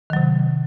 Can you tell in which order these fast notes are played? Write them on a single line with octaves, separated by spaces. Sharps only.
D#3 F#3 C3